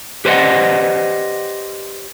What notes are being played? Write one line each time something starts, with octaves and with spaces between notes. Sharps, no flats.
G4 B4 C5 D5 D#5 F#5